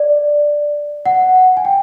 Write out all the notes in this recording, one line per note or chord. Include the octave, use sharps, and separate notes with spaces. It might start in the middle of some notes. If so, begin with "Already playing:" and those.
Already playing: D5
F#5
G#5
G5